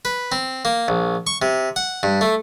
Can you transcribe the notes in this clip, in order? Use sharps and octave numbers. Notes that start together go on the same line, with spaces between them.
B4
C4
A#3
A#1
C#6
C3
F#5
G2
A3